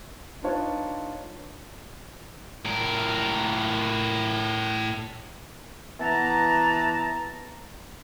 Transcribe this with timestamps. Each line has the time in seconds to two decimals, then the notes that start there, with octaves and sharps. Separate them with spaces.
0.43 D4 D#4 F4 B4 C#5 A5
2.65 A2 A#4
6.00 E3 B3 A5 A#5